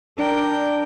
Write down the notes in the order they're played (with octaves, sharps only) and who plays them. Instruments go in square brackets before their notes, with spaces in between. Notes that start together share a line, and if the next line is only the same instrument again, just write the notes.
[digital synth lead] D4 [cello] A#4 G5